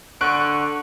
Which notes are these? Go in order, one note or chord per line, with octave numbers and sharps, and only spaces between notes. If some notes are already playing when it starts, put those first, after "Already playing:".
D3 C#6 F#6 D7